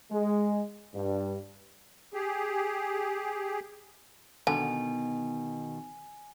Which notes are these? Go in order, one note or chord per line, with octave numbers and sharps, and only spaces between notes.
G#3
G2
G4 G#4
B2 D3 D#3 G#5